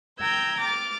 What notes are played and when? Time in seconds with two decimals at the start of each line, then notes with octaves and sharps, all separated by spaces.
0.19 G5 A#5 E6 G6 G#6
0.61 D6 F6 A6